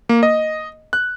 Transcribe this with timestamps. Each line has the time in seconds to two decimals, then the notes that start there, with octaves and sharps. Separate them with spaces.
0.09 A#3
0.23 D#5
0.93 F#6